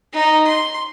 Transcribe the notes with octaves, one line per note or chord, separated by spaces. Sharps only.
D#4
C6